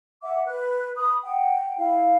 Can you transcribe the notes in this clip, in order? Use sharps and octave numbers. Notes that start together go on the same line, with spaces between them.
E5 F#5 D6
B4 F#6
B5 D#6
F#5 G5
E4 F5